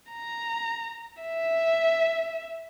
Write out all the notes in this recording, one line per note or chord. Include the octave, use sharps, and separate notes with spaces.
A#5
E5